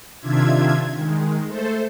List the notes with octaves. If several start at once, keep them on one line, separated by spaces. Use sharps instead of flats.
C3 D#3 D4 F4 E5 G#6
D#3 G#3
A3 A4 C5